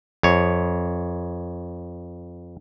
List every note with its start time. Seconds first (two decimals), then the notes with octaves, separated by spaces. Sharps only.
0.23 F2 C#5